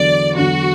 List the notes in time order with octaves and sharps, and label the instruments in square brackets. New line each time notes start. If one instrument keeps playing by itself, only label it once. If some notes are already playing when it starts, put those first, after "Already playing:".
Already playing: [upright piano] E2 D3 F#3 [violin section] D5
[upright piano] E2 D3 F#3 [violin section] F#4